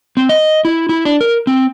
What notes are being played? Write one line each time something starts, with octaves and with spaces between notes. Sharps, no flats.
C4
D#5
E4
E4
D4
A#4
C4